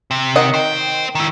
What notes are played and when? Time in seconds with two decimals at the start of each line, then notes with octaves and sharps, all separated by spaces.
0.11 C3
0.36 D#3 D#5 F#5
0.54 C5 G5
1.15 D#3 E4